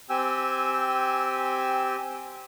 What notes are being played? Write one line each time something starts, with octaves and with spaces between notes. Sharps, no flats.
C4 G4 G5 G#5 E6